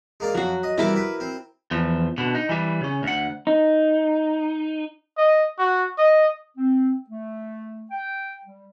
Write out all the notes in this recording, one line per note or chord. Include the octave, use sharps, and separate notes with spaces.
G#3 A#3 D5
F2 F#3 F#4
D#5
C3 E3 G3 E4 A#4 D6
B4
C4
E2 F3
B2 D3
D#4
E3 G3
C#3 C#4
D2 F#5
D#4
D#5
F#4
D#5
C4
A3
G5
G3